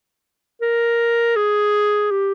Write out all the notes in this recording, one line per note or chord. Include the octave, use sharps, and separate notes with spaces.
A#4
G#4
G4